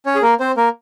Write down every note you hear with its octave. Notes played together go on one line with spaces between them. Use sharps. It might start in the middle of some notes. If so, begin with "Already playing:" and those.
C#4 C#5
G#4
A#3 A#4
C4 C5
A#3 A#4